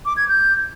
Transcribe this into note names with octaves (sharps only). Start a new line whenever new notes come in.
D6
G#6
G6